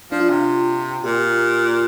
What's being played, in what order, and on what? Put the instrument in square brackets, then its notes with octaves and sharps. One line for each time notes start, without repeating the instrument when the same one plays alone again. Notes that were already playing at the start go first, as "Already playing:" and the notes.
[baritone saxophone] F3 [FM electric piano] D4
[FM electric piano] F4
[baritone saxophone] C3
[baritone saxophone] A#2 [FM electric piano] G4